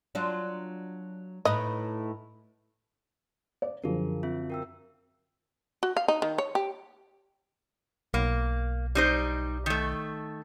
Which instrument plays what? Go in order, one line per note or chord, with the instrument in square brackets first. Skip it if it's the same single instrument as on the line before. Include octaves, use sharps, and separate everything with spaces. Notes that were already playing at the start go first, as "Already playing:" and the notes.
[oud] F#3 D4 F4
[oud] A2 D#4 B4 [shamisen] D#5
[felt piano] D5
[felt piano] F#2 D3 F3 [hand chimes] G#4 A#4
[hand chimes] C4 F4 E5
A#4 G5 E6
[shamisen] F#4
F5
D#4
D#3
C#5
G4
[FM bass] B1 [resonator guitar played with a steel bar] A#3
[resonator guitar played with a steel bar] G3 D#4 C5
D#3 A3